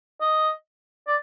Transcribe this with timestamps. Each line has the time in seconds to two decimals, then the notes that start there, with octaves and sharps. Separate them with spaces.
0.21 D#5
1.08 D5